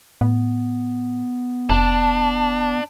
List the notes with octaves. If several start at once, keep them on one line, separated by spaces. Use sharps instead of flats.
A2 B3
F1 D4 A5